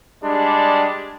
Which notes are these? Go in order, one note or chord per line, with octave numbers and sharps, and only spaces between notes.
G3 G#3 D4